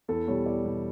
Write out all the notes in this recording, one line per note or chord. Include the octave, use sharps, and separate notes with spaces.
E2 A4
B2 G3 C#5
E2 D5
B2 G3